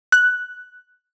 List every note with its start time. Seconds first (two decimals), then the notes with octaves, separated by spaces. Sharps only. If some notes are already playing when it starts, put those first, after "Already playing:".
0.12 F#6